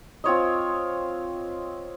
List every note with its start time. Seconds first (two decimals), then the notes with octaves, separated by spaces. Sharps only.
0.24 C4 F4 C#5 D#5